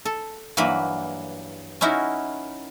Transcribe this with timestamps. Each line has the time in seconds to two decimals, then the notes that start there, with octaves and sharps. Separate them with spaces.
0.05 A4
0.57 G2 E3 F#3 A#3 B5
1.81 C#4 D#4 E4 F#4 A#4